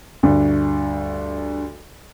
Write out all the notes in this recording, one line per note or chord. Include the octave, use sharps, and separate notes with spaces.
D2 G2